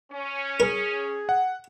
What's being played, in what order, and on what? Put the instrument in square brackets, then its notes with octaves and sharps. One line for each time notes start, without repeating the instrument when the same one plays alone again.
[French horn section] C#4
[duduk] G#4 [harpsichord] A#4
[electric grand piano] F#5